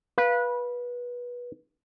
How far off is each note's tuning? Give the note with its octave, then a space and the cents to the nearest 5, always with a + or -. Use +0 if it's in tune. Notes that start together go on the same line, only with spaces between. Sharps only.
B4 -20 F5 +0